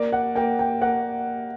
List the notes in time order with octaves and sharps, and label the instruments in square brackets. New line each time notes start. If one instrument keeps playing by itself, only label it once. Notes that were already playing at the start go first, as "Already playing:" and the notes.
Already playing: [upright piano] A#3 [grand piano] D5
[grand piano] F#5
[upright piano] A#3 [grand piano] G5
[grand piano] G5
[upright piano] A#3 [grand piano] F#5